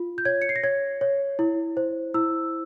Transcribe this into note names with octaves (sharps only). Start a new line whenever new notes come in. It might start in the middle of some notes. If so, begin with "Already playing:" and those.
Already playing: F4
G6
C#5 G#6
C#7
C7
A#6
C#5 G#6
C#5
E4
C5
E4 E6